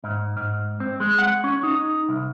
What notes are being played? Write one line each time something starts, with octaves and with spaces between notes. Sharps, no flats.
G#2
G#2
C4
G#3
F#5
C#4
D#4
C2